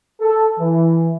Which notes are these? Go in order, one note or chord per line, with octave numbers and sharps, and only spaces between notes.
A4
E3